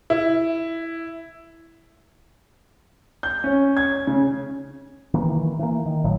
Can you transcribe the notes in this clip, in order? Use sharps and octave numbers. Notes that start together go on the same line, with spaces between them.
E4
G6
C#4
G#6
C#3
D#3 E3 A#3
E3 A#3
D#3
G#1 A2 F#3